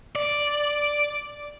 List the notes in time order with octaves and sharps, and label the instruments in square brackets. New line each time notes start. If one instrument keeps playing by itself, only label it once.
[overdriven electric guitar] D5